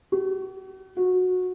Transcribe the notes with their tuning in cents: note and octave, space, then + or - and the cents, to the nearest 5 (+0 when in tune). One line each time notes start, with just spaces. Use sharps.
F#4 +45
F#4 -15